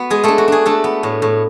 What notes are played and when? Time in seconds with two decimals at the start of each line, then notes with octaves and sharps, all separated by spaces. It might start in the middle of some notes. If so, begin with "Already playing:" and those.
Already playing: B3 F#4
0.10 G#3 G#4
0.24 A3 D4 A4
0.38 F#4
0.48 D4 G#4
0.65 A3 D4 A4
0.84 B3
1.03 A2
1.22 A2